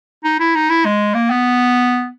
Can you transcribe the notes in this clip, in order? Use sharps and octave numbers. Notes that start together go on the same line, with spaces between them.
D#4
E4
D#4
E4
G#3
A#3
B3